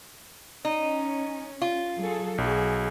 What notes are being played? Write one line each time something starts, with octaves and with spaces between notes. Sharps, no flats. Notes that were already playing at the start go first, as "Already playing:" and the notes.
C#4 D#4
F4
F#3 G#4 A4
B1 F#4 G#4